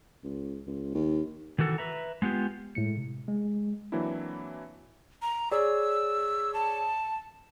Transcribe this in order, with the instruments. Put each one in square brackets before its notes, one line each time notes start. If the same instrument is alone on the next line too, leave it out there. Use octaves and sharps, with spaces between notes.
[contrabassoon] C#2
C#2
D#2
[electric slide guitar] D#3 E3 F#4 A4
B4 E5 A#5
G#3 B3 F4 G4
[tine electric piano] A2 G#3 C#7
C3
G#3
[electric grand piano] E3 F#3 A#3 C4 D4 E4
[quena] A#5
[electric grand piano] G#4 C#5 D5 [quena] E6
[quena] A5